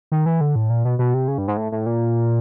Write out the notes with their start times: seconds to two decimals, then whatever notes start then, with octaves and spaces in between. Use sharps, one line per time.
0.12 D#3
0.26 E3
0.41 D3
0.55 A2
0.70 A#2
0.85 B2
0.99 B2
1.14 C3
1.28 C#3
1.38 G2
1.48 G#2
1.57 A2
1.72 A2
1.86 A#2